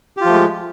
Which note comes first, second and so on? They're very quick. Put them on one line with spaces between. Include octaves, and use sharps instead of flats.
G4 F4 F3 A3 G#3